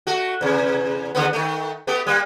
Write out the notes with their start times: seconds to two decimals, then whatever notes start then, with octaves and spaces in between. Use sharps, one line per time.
0.07 A3 F#4
0.41 E2 C3
1.15 D#2 D3 B3
1.33 D#3 A3
1.87 A3 B3 G4
2.07 G3 A#3